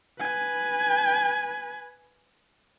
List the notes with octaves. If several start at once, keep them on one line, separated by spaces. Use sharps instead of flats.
B4 G#5